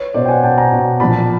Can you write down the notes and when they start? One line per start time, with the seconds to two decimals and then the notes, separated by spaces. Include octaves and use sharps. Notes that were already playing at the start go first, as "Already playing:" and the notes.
Already playing: B4 C#5
0.14 B2 C5 D5
0.25 G5
0.29 F#5 G#5
0.43 B2 G5 A5
0.58 G#5 A#5
0.72 B2
1.00 A#2 F3 A5 B5